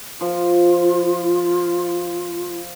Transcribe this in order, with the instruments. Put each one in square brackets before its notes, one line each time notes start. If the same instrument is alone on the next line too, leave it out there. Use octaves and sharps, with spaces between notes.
[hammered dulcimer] F3 [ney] F4